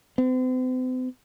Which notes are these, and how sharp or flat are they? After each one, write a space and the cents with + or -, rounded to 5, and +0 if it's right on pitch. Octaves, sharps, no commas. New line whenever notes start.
C4 -45